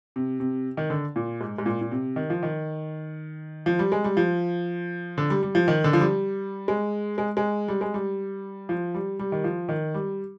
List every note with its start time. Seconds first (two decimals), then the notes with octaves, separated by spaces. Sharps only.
0.16 C3
0.40 C3
0.77 D#3
0.90 D3
1.16 A#2
1.41 G#2
1.58 G#2
1.66 A#2
1.81 A#2
1.91 C3
2.16 D#3
2.30 F3
2.43 D#3
3.66 F3
3.79 G3
3.92 G#3
4.04 G3
4.17 F3
5.18 D3
5.30 G3
5.43 G3
5.55 F3
5.68 D#3
5.84 D3
5.93 F3
6.01 G3
6.68 G#3
7.18 G#3
7.37 G#3
7.68 G3
7.81 G#3
7.94 G3
8.69 F3
8.94 G3
9.19 G3
9.32 D#3
9.44 F3
9.69 D#3
9.94 G3